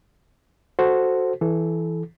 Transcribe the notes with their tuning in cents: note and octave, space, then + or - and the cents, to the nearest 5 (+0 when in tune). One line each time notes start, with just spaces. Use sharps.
F#4 +0 A4 +0 C5 +0
E3 +0 A4 -25